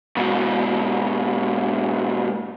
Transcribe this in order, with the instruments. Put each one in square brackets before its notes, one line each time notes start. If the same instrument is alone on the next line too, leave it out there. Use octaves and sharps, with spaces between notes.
[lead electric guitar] G#2 B2